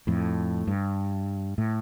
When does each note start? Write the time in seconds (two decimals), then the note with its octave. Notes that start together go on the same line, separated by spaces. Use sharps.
0.07 F2 A2
0.67 G2
1.58 A2